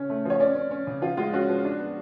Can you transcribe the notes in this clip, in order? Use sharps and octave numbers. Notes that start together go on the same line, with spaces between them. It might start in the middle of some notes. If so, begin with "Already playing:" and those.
Already playing: C#3 C#4
A3
F3 C#5
C#4 D5
C#4
C#4
C#3
F3 F4
G#3 F4
C#4 F#4
F3
D4
B3